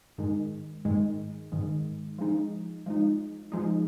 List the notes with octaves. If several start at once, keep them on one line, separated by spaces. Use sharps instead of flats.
G#2 D#3 G#3
G#2 D#3 G#3
G#2 D#3 G#3
F3 G#3 D#4
F3 G#3 D#4
F3 G#3 D#4